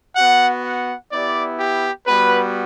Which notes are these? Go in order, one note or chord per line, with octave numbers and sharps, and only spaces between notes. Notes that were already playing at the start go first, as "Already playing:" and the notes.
B3 F#4 F#5
F#5
B3 E4 G4 D5
G4
G3 B3 F#4 B4